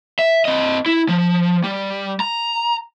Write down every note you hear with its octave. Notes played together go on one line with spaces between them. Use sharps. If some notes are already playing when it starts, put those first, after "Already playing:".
E5
C4 D#5
E4
F3
G3
A#5